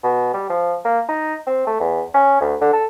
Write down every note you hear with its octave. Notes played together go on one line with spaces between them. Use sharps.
B2
G3
F3
A#3
D#4
C4
A3
E2
C#4
D2
D3
A4